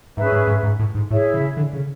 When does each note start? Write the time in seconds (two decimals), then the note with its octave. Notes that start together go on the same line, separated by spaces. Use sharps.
0.16 G#2 C#4 G#4 B4 E5
0.32 G#2
0.47 G#2
0.63 G#2
0.79 A2
0.95 G#2
1.10 A2 E4 G#4 C#5 E5
1.34 C#3
1.57 D3
1.73 C#3